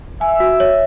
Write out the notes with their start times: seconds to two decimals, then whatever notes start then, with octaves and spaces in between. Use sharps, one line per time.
0.21 E5 G#5
0.40 F#4
0.60 C#5